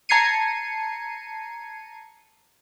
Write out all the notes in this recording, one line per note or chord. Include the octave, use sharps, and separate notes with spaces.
A5 A#5 G#6 C7 C#7 D#7